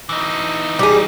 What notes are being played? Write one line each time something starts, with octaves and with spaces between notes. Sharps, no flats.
E3 D#4
G3 G#4